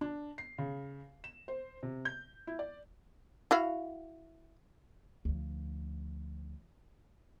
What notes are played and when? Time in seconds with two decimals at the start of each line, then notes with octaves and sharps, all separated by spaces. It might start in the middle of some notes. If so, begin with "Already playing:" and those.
0.01 D4
0.38 C7
0.58 C#3
1.24 E7
1.48 C5
1.83 C3
2.05 G6
2.47 E4
2.59 D5
3.51 E4 F#4 F5
5.25 D2 F3